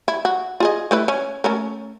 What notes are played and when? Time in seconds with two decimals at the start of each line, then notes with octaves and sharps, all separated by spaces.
0.08 E4
0.25 F#4
0.60 F4 G#4 D#5
0.91 A3 E4 B4
1.08 C#4
1.44 A3 C#4 A#4